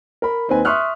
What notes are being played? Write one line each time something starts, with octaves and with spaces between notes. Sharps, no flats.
A#4 B5
D#2 C4 D#4 B4 G#5
E5 C6 C#6 D#6 F6 F#6